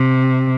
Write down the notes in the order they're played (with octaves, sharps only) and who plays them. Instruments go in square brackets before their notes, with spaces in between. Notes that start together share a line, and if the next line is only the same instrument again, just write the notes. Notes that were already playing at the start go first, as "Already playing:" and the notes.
Already playing: [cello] C3